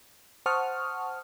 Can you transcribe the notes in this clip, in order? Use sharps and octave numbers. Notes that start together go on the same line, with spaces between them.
C5 F#5 A5 C#6 D#6 F6